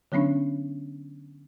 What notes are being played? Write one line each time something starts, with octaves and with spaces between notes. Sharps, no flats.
D3 F#3 B3 C#4 D4